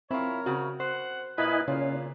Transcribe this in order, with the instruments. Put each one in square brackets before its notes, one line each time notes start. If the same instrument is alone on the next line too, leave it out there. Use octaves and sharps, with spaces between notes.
[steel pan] C4 [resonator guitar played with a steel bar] E4 F4 [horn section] A#4 C#5
[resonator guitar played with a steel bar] C#3 C4 [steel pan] F#4
[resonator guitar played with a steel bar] C5 [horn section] F#5
[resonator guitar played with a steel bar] A#2 [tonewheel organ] E4 D#5 G#5 [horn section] A#4 B4
[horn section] A#2 [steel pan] C#3 [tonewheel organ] C#4 [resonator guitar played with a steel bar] F4